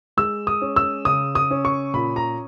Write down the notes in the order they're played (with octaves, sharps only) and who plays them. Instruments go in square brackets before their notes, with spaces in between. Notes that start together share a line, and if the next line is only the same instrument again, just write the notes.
[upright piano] G#3 E6
D#6
C#4
E6
C#3 D#6
D#6
C#4
C#6
A#2 B5
A#5